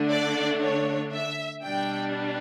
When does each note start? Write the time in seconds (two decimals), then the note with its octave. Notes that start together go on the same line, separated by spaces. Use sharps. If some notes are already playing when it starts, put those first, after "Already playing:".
Already playing: D3 A3 D4
0.11 D5
0.62 C#5
1.12 E5
1.63 B2 G3 D4 G5